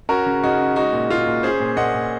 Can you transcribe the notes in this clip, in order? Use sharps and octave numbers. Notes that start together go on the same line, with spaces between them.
C#4 F#4 A#4
C#3
C#3 D#4 F#4
C#4
G#3 D#4 F#4
A#2
A#2 F4
A#2
C#4 G#4 C5
A#2
A#2 D#5 F#5
A#2